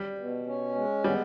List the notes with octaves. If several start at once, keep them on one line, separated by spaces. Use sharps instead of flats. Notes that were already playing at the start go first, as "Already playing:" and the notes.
Already playing: G3
B2
C#4
G#3
G3 B3